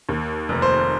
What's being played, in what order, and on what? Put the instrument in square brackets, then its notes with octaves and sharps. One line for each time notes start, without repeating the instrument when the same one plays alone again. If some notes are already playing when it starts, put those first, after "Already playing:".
[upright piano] D#2
F1
[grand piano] C5